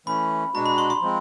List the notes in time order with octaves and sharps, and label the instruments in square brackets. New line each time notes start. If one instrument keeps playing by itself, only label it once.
[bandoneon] E3 A3 C#4 [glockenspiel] B5
[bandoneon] B2 G#3 B3 D4 F#4 [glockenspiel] A#5
[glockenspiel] B5
C6
C6
[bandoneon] F3 G#3 C4